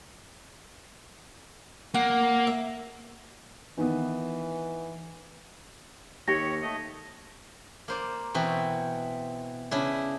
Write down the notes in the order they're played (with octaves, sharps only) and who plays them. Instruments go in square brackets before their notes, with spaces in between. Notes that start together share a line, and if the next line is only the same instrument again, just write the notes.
[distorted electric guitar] A#3 [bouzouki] F#5
[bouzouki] E5
[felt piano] D#3 B3 [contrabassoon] E3
[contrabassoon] D#2 [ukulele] G4 [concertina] C#5 [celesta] A#6 C#7
[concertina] A3 D#5
[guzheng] A#3 C5 D5
B2 E3 C4
C#3 D4 E4